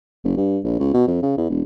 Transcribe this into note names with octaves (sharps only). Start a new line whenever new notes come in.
F#1
G2
A#1
C#2
B2
F2
C#3
E2
E1